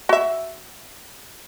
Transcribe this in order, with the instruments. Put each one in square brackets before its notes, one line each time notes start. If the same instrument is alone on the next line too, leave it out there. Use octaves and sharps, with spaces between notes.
[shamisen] F#4 E5